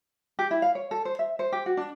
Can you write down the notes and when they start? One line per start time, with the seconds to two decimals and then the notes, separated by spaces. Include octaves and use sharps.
0.39 G4
0.51 E4
0.62 F5
0.75 C#5
0.91 A4
1.05 C5
1.19 E5
1.39 C5
1.52 G4
1.66 F#4
1.77 D4